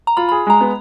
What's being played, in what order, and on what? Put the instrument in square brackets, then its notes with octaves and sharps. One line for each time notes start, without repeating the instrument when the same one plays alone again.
[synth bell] A#5
[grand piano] F4 [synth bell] B5
[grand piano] G#4 [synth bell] B5
[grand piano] G#3 [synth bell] A#5
[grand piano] B3